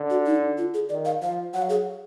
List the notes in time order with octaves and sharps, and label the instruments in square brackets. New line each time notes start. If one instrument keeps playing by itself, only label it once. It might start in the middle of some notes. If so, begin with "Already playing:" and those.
Already playing: [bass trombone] D3
[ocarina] F#4
D#4
F4
G#4
[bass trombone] D#3 [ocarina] D5
[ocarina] F5
[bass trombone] F3 [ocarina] F5
[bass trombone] F#3 [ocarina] F#5
[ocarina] F5
G#4